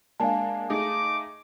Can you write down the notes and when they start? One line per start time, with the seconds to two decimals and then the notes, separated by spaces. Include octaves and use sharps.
0.20 G#3 A#3 D4 F5 G#5 A5
0.70 A3 D#4 G#4 D6